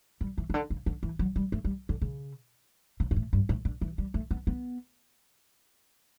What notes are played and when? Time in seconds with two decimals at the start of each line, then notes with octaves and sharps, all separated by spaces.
0.21 G3
0.38 E3
0.50 C#3
0.54 D3
0.70 C#3
0.86 D3
1.03 E3
1.19 F#3
1.36 G3
1.52 A3
1.65 G3
1.89 D3
2.02 C#3
3.00 C#3
3.11 G2
3.16 A2
3.33 G2
3.49 A2
3.65 D3
3.81 E3
3.98 G3
4.14 A3
4.31 B3
4.47 B3